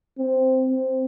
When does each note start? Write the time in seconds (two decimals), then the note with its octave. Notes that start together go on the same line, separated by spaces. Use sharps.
0.19 C4
0.69 C4